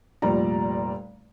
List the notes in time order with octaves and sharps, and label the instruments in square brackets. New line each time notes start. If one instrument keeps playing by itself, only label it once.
[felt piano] F1 A#2 G3 D5 A#5